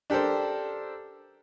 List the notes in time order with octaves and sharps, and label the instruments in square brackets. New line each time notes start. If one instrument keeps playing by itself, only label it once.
[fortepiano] D4 G4 A4 A#4 C5